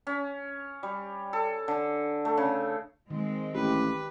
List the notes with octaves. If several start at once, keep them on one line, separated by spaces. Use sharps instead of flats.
C#4
G3
A4
D3
A3
C#3
D#3 G#3 C4
A1 G4 B4